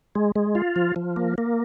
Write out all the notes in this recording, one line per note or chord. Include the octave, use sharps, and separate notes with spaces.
G#3
G#3
F4
F3
F3
A#3
A#3